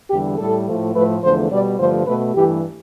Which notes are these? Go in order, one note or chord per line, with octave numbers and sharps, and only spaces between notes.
E2 D3 G3 G4
A2 G3 A4
A2 F3 A3
A2 F3 A3 B4
E2 D3 F3 A3 C5
B2 G3 D5
G2 D3 F3 A3 C5
B2 A3 B4
G2 E3 A3 G4